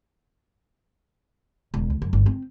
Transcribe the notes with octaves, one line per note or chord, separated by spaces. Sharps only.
E1
D2
F#2
G1
C4